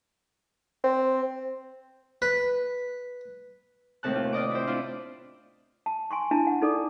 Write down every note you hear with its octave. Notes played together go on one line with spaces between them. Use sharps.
C4
B4
D#2 A2 C3 A5 F#6
F4
F4 D5 D#5 D6
E4 C5
D4 E4 F4
A5
G#5 C6 C#6
D4 E4 A5
F#5
D#4 A4 D5 D6